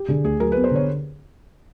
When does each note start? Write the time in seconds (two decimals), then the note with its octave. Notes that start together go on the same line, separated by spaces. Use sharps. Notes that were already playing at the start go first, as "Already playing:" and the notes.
Already playing: G4
0.08 D3 G#4
0.24 D2 G#4
0.40 F#3 A#4
0.52 B3 B4
0.64 C5
0.71 D3 C#5